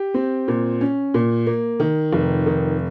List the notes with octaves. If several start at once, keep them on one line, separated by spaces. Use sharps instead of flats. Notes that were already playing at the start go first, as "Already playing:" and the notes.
Already playing: G4
C4
A#2
C#4
A#2
A#3
D#3
F1
D#3